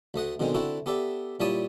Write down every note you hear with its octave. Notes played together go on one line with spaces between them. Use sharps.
D2 A3 D#5 F#5
B2 D3 D#3 G#3 C4
D3 C4 E4 F#4 A4
B3 G4 A4 D5 E5
A#2 G3 E4 C#5 A5 D#6